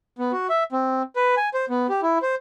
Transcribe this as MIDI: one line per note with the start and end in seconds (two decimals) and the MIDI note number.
0.18 0.32 59
0.32 0.47 66
0.50 0.64 76
0.72 1.02 60
1.16 1.35 71
1.37 1.49 80
1.54 1.65 72
1.69 1.87 59
1.89 2.01 67
2.02 2.18 64
2.22 2.35 72